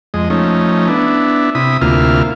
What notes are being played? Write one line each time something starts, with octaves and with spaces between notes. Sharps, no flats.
F2 G#3 D#5
F3 A3 C#4 D#4
B3 D4 E4
C3 E4 B5 D#6
D2 C3 A#3 E4 F4 F6